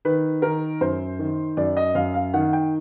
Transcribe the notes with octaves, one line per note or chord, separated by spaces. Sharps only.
D#3 B4
D#3 A#4
F#2 C5
D#3
F#2 D5
D#5
F#2 F5
F5
D#3 F#5
G5